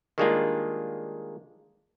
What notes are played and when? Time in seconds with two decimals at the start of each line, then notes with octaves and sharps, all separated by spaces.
0.18 D#3 G3 G#3 A#3 D4 F4